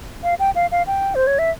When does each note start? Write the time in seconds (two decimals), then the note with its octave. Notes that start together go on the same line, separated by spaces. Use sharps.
0.23 F5
0.39 G5
0.55 F5
0.72 F5
0.87 G5
1.15 C5
1.27 C#5
1.39 E5